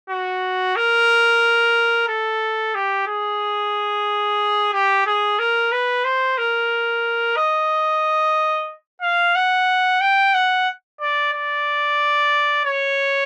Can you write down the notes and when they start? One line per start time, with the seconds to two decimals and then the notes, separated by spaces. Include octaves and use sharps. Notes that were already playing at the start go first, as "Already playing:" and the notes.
0.10 F#4
0.76 A#4
2.09 A4
2.75 G4
3.07 G#4
4.73 G4
5.06 G#4
5.39 A#4
5.72 B4
6.04 C5
6.38 A#4
7.36 D#5
9.02 F5
9.36 F#5
10.01 G5
10.34 F#5
11.00 D5
11.33 D5
12.65 C#5